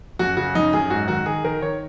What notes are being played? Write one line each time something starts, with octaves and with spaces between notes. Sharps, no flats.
F#2 F#4
C#3 F#4
F#2 D#4
F#2 G#4
G#2 F#4
D#3 F#4
D#3 G#4
D#3 A#4
D#3 C#5